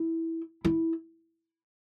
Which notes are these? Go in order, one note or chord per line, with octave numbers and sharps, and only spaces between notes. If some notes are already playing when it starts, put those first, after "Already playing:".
Already playing: E4
E4